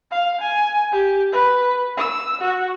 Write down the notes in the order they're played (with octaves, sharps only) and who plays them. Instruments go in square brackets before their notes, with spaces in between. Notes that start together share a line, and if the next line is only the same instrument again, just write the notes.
[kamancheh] F5
G#5
G4
B4
E6
F#4